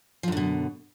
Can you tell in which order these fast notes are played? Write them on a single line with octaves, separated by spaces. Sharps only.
F3 F#2 D3 B2